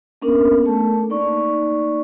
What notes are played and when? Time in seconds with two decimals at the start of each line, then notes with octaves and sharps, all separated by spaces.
0.22 A#3 B3 C#4 D4 A#4
0.65 A3 A4 A5
1.10 A#3 D#4 D5 C#6